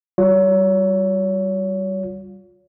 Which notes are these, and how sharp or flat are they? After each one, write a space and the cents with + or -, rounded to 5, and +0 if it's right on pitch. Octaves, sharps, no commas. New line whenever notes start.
G3 -20 F4 +35 C#5 +30